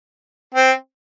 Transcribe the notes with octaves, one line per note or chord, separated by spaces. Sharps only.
C4